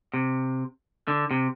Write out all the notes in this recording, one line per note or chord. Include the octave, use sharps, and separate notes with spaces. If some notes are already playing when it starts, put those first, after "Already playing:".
C3
D3
C3